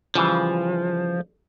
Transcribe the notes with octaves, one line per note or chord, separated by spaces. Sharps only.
C#3 E3 F3 G3